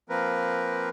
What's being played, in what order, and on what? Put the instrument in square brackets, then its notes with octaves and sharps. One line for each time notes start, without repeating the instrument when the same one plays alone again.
[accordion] F3 A#3 C4 A#4 B4